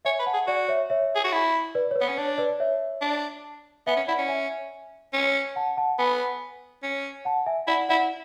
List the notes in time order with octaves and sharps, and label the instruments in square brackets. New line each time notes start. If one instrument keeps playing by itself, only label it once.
[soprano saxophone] C#5 [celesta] E5 G#5
[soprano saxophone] B4
[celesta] F#5 A5
[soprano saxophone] G#4
[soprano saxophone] F#4 [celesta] D5 F#5
[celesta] C#5 E5
C#5 E5
[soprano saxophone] G#4
F#4
E4
[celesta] B4 D5
C#5
B4
[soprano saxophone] B3
C#4
[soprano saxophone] D4 [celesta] C#5
[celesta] B4 D5
C#5 E5
[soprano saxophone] D4
[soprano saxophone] B3 [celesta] E5 G#5
[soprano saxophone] C#4
[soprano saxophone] E4 [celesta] D5 F#5
[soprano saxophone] C#4
[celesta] E5 G#5
[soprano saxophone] C#4
[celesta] F#5 A5
F#5 A5
[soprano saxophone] B3 [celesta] G#5 B5
[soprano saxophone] C#4
[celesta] F#5 A5
E5 G#5
[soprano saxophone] E4 [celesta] D5 F#5
[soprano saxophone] E4 [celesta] D5 F#5